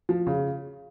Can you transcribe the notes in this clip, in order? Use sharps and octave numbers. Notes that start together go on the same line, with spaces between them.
F3
C#3